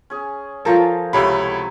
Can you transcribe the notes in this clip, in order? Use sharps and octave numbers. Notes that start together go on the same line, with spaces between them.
C#4 G#4
F3 F4 A4 A#4 C5 C#5
C#2 C3 F#3 A3 E4 C#5 B5